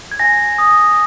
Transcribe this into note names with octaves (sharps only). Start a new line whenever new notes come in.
G#6
G#5 A#6
D#6